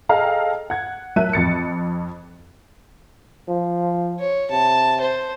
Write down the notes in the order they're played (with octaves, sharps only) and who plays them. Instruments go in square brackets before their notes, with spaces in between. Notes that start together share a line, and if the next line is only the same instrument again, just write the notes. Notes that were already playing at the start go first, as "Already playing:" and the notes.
[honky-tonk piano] G#4 A4 D#5 F5 G5 A#5
F#5 G#6
F#3 A#4 E5 A5 F#6 D#7
F2 A6 C#7
[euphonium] F3
[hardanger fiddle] C#5
[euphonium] C3 [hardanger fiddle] A5
[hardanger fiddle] C5